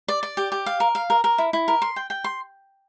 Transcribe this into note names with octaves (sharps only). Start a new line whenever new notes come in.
D5
D5
G4
G4
F5
A#4
F5
A#4
A#4
E4
E4
A#4
C6
G5
G5
C6